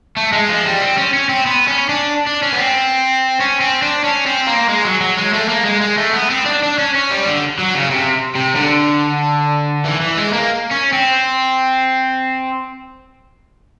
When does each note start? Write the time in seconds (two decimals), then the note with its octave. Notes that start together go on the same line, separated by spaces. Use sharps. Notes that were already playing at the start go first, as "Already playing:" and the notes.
0.17 A3
0.32 G#3
0.49 F3
0.66 G3
0.81 C4
0.98 C#4
1.14 C#4
1.29 C4
1.46 B3
1.68 C#4
1.89 D4
2.27 D4
2.43 C#4
2.53 B3
2.59 C4
3.40 C#4
3.61 C4
3.82 D4
4.04 C#4
4.26 C4
4.47 A#3
4.69 G#3
4.85 F#3
5.01 F#3
5.17 G#3
5.34 A3
5.49 A#3
5.65 G#3
5.81 G#3
5.98 A3
6.13 B3
6.30 C4
6.46 D4
6.62 D4
6.78 C#4
6.95 C#4
7.11 G3
7.27 D3
7.59 F#3
7.75 C#3
7.91 C3
8.35 C3
8.55 D3
9.85 E3
10.01 E3
10.17 G#3
10.33 A#3
10.71 C#4
10.92 C4